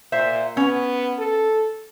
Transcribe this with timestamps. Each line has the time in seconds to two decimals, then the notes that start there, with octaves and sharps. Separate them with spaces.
0.12 A#2 C5 E5
0.57 B3 C#4
1.19 A4